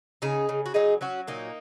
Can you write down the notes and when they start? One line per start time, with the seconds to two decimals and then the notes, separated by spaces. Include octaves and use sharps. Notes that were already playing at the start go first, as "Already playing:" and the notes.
0.22 C#3 D#4 G#4
0.49 C#3
0.66 F#4
0.74 F#3 D#4 G#4
1.01 F#3 C#4 F#4
1.27 A#2 A#3 D#4